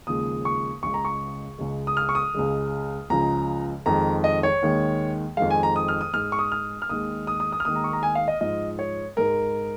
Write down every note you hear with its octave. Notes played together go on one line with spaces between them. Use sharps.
D#2 C#3 F3 G#3 D#6
C#6
C#2 C#3 G#3 C#6
A#5
C#6
C#2 C#3 G#3
D#6
F6
C#6
D#6
C#2 C#3 G#3
C#2 C#3 F3 G#3 A#5
F2 D#3 G#3 A#5
D#5
C#5
D#2 D#3 G#3
F2 D#3 G#3 F5
G#5
A#5
D#6
F6
D#6
G#2 G#3 F6
C#6
D#6
F6
F6
D#2 D#3 G#3 D#6
D#6
D#6
D#6
F6
D#2 D#3 G#3 D#6
A#5
C#6
A#5
G#5
F5
D#5
G#2 F3 G#3 D#5
C#5
G#2 G#3 A#4